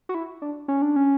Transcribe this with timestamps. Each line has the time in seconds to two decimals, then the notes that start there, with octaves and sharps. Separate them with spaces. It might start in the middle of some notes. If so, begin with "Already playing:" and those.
0.09 F#4
0.15 E4
0.42 D4
0.68 C#4
0.82 D4
0.96 C#4